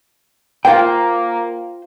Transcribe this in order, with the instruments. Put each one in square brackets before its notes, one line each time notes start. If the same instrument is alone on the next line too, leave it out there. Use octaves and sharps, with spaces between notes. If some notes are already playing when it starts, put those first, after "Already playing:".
[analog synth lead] A#3 [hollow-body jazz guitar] F4 C5 G5